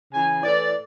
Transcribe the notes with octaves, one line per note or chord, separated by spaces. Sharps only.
C#3 E3 G#5
A2 E3 D5